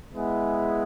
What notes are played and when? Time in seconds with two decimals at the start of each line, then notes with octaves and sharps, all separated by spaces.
0.12 G#3 B3 E4 G#4